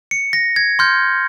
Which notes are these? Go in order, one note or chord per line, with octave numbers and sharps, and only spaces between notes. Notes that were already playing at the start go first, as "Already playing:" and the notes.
C#7
A#6
G#6
C6 F6 G6